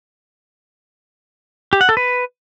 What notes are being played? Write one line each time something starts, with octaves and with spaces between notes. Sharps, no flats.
G4
F#5
A4
B4